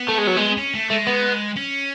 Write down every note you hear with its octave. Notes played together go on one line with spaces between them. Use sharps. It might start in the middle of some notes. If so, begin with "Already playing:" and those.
Already playing: B3
A3
G#3
F#3
G#3
C#4
A3
G#3 A3
B3
C#4